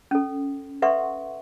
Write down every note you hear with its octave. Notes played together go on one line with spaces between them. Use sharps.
C#4 A4
A4 B4 E5 F#5 C6 C#6